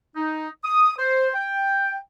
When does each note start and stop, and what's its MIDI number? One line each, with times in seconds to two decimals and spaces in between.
0.16 0.48 63
0.64 0.93 87
0.99 1.30 72
1.35 1.97 79